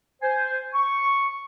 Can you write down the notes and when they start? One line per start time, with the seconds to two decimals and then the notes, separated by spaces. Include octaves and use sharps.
0.22 C5 G#5
0.74 C#6